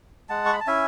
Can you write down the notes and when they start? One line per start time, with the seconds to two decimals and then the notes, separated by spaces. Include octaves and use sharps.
0.29 G#3 F#5 A5
0.46 C#6
0.53 B5
0.60 A5
0.67 C#4 E4 E5 G#5